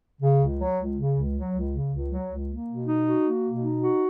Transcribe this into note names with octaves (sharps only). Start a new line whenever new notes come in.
C#3
C#2
F#3
C#2
C#3
C#2
F#3
C#2
C#3
C#2
F#3
C#2
A#3
B2
D#4
F#4
A#3
B2
D#4
F#4